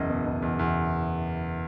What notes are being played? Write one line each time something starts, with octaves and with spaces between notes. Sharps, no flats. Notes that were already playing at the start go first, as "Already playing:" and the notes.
Already playing: F#1 E2 D#5
B2
F#1
E2
E2